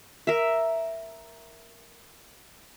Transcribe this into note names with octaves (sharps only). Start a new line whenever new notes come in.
A#4 E5